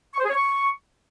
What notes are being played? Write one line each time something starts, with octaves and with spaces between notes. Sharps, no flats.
C#6
C5
G#4
C#5
C#6